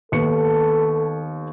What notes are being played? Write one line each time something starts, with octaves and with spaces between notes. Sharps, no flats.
D#2 B3 A4 C#7